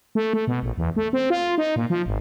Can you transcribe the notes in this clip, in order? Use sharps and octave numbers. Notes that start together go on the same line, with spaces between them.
A3
A3
B2
A#1
E2
A3
C4
F4
D#4
A#2
F3
G#1